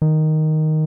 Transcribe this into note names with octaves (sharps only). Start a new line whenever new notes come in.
D#3